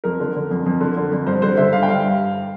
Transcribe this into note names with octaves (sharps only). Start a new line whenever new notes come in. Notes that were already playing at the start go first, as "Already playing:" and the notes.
F2 A#4
D3
D3
F2
F2
D3
D3
F2
G2 C5
D3 C5
D3 E5
G2 F5
G5
G2 F5